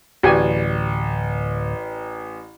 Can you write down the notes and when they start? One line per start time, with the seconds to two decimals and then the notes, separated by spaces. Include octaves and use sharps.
0.23 D1 A1 F#4 G4 D5 G#5